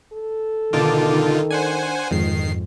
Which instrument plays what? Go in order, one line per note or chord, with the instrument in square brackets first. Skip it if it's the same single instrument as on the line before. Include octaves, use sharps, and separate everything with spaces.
[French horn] A4
[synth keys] B2 A5 D6 [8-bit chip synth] D3 D#4 F4 [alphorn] D#3
[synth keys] D4 [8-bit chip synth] C5 F#5 G#5
[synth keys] F2 G#2 [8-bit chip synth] D#3 C7